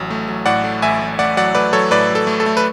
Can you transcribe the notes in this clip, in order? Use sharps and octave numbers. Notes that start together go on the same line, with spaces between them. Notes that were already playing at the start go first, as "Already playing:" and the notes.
Already playing: A1 F#3
A3
F#3
A2 D5 F#5
A3
A1 E5 G#5
A1
A3 D5 F#5
F#3 D5 F#5
A3 B4 D5
F#3 A4 C#5
A2 B4 D5
F#3
A4
A3
A4
A3
B4